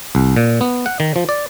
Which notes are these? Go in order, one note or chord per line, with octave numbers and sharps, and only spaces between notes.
C2
A#2
B3
F#5
D#3
F3
D5